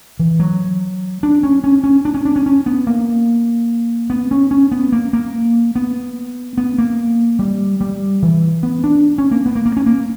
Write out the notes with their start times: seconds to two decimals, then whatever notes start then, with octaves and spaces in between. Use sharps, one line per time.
0.19 E3
0.40 F#3
1.23 D4
1.43 C#4
1.64 C#4
1.84 C#4
2.05 D4
2.14 C#4
2.25 D4
2.36 C#4
2.46 C#4
2.66 B3
2.87 A#3
4.10 B3
4.31 C#4
4.51 C#4
4.72 B3
4.92 A#3
5.13 A#3
5.76 B3
6.58 B3
6.78 A#3
7.39 G3
7.81 G3
8.22 E3
8.63 B3
8.84 D4
9.18 C#4
9.31 A#3
9.46 B3
9.55 A#3
9.66 A#3
9.77 C#4
9.86 A#3